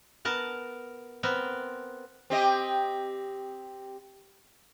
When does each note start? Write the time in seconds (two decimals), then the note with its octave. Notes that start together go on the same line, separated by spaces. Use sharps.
0.25 B3 A#4 A5
1.23 B3 C4 A#4
2.30 C4 G4 D#5